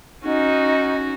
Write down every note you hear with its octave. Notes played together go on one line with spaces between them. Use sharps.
C#4 D#4 F#4